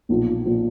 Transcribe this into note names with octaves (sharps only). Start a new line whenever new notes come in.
B1 A#2 F3
A#2 F3